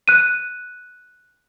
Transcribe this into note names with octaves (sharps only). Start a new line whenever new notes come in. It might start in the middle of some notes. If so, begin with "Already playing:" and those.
F#6 D#7